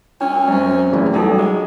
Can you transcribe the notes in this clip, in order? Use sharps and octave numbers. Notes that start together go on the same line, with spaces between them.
C#4 D4
F#2 C4
A1 E2 E4
F#3 G3 D4 D#4 A4
G#3